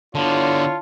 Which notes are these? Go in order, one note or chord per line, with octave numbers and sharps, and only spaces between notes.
D3 B3 D4 E4 F4 C#5 A5